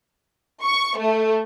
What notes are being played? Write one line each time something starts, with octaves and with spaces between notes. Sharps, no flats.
C#6
A3